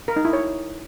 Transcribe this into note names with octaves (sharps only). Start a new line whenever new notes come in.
A#4
D#4
E4
C#5